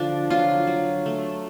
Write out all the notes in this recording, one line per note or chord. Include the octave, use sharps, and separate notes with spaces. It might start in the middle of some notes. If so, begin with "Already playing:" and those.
Already playing: D3 F3 D4 F4
F#3 F4
F#3
A3